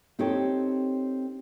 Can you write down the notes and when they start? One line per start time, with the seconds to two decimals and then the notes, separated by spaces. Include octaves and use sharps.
0.19 C4 D#4 G4 A4 C#5